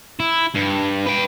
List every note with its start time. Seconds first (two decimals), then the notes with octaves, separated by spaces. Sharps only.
0.20 E4
0.54 G2
1.06 B4 G5